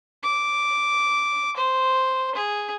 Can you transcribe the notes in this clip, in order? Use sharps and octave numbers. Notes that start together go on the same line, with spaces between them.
D6
C5
G#4